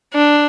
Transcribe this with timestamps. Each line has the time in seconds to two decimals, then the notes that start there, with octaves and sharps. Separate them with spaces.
0.13 D4